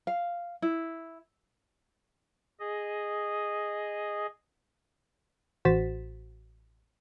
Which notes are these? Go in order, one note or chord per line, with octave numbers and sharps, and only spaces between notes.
F5
E4
G#4 D#5
A1 F#4 C5 A6 B6 E7